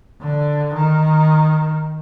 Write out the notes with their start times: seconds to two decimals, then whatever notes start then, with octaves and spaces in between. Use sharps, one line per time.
0.22 D3
0.75 D#3